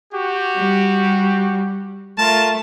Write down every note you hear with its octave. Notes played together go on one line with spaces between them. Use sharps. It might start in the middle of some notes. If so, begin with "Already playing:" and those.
F#4 G4
G3
A3 F4 A#4 A5